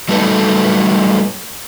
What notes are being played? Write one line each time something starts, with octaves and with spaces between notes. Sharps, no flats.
F#3 G3 A3 D#4 A4 B4